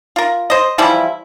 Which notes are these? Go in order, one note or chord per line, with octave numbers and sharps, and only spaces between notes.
F4 A#4
C5 D#5
E3 F3 G3 E4